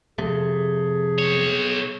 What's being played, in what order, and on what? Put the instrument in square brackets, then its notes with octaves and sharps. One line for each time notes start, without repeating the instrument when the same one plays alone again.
[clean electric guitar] F2 C3 A3 [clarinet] G#4
[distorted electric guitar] B1 C#5